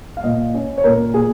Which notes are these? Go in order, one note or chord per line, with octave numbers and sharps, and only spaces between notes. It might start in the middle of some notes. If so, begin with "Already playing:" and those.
F5
A#2 D#5
C#4
C#5
A#2 A#4
A#2 G#4